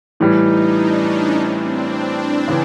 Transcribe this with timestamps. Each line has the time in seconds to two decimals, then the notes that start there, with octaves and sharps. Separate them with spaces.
0.20 A2 E3 G3 D#4
0.48 D4
0.76 C#4
1.05 C#4
1.34 C4
1.63 D4
2.48 C#3 E3